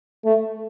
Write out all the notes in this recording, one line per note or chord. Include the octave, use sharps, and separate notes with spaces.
A3